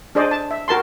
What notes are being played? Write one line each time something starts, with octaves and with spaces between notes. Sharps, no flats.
D4 G#4 C5 D5 D#5
A5
E5
F#4 A#4 A5 C6